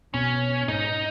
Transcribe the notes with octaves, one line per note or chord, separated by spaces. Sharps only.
B2 C#4
G#2 D#4